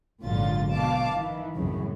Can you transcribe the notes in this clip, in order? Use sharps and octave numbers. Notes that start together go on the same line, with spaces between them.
G#1 A#2 D3 F#3 F4 A6
B2 F5 A5 D6
D#3 E3
C2 F#2 A2 C#3 F#3